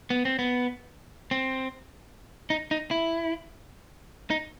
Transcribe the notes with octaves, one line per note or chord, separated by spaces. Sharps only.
B3
C4
B3
C4
D#4
D#4
E4
D#4